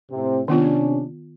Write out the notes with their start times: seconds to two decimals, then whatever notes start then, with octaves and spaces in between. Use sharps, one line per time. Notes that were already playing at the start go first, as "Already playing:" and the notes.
0.11 A2 C3 C4
0.48 C3 D#3 B3 C#4 D4 F4